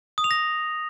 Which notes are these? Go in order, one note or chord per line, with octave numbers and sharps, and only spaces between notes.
D#6
F7
A#6